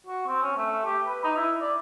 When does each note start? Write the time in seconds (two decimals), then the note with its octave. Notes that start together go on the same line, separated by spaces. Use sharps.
0.06 F#4
0.27 C4
0.42 C#4
0.57 A3
0.85 G4
1.07 B4
1.24 D#4
1.36 E4
1.61 D5